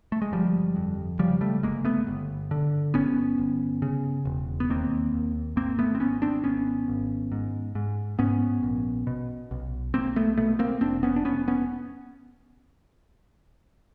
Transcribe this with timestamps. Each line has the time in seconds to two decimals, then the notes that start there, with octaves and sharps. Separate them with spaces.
0.12 A3
0.22 G#3
0.32 G1 F3 G3
0.76 F2
1.19 C#3 F3 G3
1.41 G3 A3
1.63 G1 G#3 A#3
1.85 A3 B3
2.07 G1
2.51 D3
2.94 G1 B3 C#4
3.38 G1
3.82 C#3
4.25 E1
4.60 B3
4.70 D#2 A#3 C4
5.13 D#2
5.56 G#1 A#3 C4
5.79 A3 B3
5.95 C4
6.00 G#1 B3 C#4
6.22 C4 D4
6.44 G#1 B3 C#4
6.88 G#1
7.32 G#2
7.75 G#2
8.19 G#2 B3 C#4
8.63 A#1
9.07 B2
9.51 B1
9.94 B1 A#3 C4
10.16 A3 B3
10.37 B2 A3 B3
10.59 A#3 C4
10.81 F1 C4 D4
11.03 B3 C#4
11.16 D4
11.25 F1 B3 C#4
11.48 B3 C#4